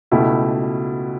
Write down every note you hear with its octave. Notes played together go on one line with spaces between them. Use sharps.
C#2 B2 A3 E4 G4